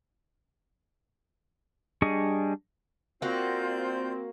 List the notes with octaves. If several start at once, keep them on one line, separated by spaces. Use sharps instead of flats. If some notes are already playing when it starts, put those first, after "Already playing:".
G3 D4 G#4 D#5 C#6
A#3 C4 F4 F#4 D5 G6